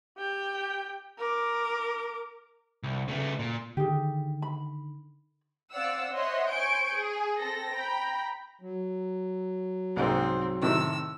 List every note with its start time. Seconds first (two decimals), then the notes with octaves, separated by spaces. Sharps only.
0.18 G4 G5
1.18 A#4 D6
2.83 C2
3.08 C#3 A3
3.39 A#2
3.77 D3 D#3 G4 G#4
4.42 B5
5.73 C4 D5 F5 F#5 E6
6.12 C5 C#5 D#5 E5 F#5 C6
6.52 C5 G#5 C#6 G6 D7
6.94 G#4
7.39 C4 A4 A#6
7.74 G5 A#5 B5
8.61 F#3
9.96 C2 G#2 A#3 C4
10.62 A2 C3 D#3 E6